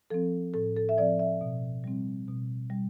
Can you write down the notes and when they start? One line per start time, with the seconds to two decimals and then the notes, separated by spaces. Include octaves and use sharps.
0.10 F3 C4 A4
0.54 A2 A4
0.77 A4
0.89 E5
0.97 F3 C4 D5
1.19 E5
1.41 B2
1.84 G3 C4
2.28 B2
2.70 G3